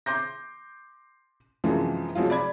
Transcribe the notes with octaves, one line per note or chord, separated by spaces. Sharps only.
C6 D6 G6 A#6
F#2 C3 E3 F3 G#3
C3 F3 F#3 G#3 F4
D5 B5 G#6